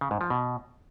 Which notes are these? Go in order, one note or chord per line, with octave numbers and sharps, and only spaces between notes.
C#3
G#2
F3
B2